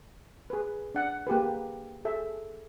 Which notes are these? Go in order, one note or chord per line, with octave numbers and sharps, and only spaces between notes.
G#4 B4
D4 F#5
A#3 G4 G#4 B4
G#4 A4 E5